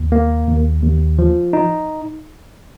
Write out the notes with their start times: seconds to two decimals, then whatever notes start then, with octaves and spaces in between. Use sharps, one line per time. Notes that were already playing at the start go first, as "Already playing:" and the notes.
Already playing: D#2
0.12 A#3
0.48 D#2
0.83 D#2
1.18 F3
1.53 D#4